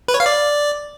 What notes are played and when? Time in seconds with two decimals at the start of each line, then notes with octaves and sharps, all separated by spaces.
0.08 B4
0.14 C#5
0.20 F5
0.26 D5